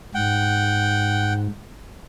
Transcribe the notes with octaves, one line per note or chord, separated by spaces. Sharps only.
G#2 F#5 G5